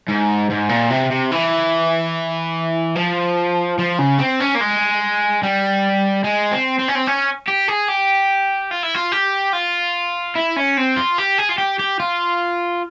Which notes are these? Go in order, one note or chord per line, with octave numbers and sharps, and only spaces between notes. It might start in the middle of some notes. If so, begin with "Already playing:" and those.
G#2
G#2
A#2
C3
C3
E3
F3
F3
C#3
C4
C#4
A#3
G#3
G3
G#3
C4
C4
C#4
C4
C#4
G4
G#4
G4
F4
E4
F4
G4
F4
E4
C#4
C4
F4
G4
G#4
F4
G4
G4
F4